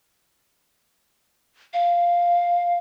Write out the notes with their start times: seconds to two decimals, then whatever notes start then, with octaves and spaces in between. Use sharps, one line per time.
1.74 F5